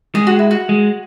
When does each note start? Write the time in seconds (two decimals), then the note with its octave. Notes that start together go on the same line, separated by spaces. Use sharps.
0.15 G#3 G#4
0.27 F#4
0.39 E4
0.51 F#4
0.69 G#3